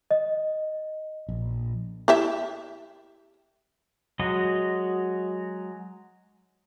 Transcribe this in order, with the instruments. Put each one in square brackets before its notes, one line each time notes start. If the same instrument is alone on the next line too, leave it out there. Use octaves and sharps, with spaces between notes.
[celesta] D#5
[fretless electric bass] A#1
[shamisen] E4 G4 E5
[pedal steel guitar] F#3 G#3 F#4 D#5